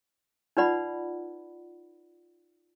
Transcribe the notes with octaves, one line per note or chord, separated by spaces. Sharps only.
D#4 F4 B4 D5 F#5 B5